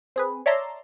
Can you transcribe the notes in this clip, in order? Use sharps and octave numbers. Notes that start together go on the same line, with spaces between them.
C4 G#4 B4
C#5 D5 E5 A5 A#5 C6